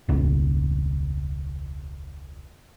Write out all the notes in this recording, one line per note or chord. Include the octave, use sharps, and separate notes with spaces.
E1 C#2